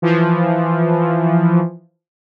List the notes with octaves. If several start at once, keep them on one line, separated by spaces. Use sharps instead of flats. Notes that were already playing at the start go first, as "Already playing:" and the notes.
E3 F3